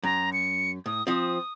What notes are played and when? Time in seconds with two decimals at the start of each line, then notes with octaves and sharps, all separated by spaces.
0.03 F#2 A#5
0.33 C#7
0.86 A2 D#6
1.07 F3 C4 D#6